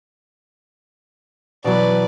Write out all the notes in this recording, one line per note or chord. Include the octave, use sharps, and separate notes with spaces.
B2 E3 F#3 B4 D5